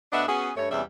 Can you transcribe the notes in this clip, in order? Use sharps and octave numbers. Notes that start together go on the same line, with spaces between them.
D2 B3 D4 D#5 E5 F#5
B3 C#4 F#4 G#4
G2 A3 C#5
E2 C3 G3 C#4 G#4 E5